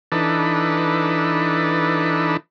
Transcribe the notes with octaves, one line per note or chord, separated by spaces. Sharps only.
E3 D4 D#4 A4 B4